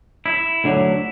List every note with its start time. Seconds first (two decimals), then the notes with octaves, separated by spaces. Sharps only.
0.26 E4
0.64 D2 D3 F#3